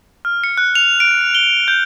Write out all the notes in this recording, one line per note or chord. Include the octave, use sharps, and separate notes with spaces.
F6
C#7
F#6
F7
D7
G7
G6